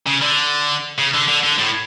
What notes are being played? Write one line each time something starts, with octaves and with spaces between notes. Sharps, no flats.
C#3
D3
C#3
D3
D3
D3
A2